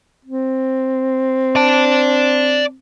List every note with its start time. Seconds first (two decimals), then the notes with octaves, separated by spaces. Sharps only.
0.25 C4
1.56 D5 A5